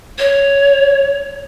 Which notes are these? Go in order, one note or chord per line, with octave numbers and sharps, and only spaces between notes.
C#5